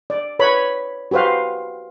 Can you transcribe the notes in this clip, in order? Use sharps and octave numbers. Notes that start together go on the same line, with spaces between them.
D5
B4 C#5 B5
F#4 G4 B4 C5 F5